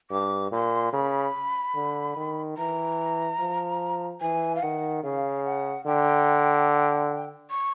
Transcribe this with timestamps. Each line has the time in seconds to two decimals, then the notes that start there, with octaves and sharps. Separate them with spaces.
0.10 G2 D6
0.52 A#2 C6
0.93 C#3 B5
1.75 D3
2.16 D#3
2.58 E3 A#5
3.39 F3
4.21 E3 G#5
4.55 F5
4.63 D#3 F#5
5.03 C#3 F5
5.45 F#5
5.86 D3 G5
7.51 C#6